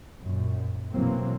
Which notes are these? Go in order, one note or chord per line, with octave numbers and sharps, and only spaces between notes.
F#2 A#2
B2 E3 F#3 A#3 C4